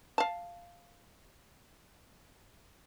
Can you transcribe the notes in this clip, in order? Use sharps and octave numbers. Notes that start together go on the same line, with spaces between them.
F5 A5